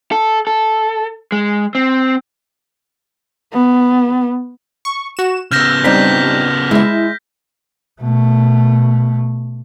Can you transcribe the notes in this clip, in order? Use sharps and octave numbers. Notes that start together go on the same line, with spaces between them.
A4
A4
G#3
C4
B3
C#6
F#4 E7
C#3 B3 E6 F6 G6 A#6 B6
G3 C4 D4 D#4 G6 B6
G#3 E4 E5
B2 A3